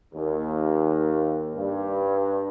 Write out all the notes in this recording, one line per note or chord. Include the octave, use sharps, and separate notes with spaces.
D#2
G2